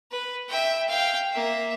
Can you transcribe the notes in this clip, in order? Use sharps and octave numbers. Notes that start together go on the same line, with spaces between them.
B4
E5 G5
F5 G5
A#3 E5